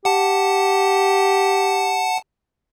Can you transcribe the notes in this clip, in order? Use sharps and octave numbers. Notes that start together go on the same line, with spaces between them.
G4 F#5 A5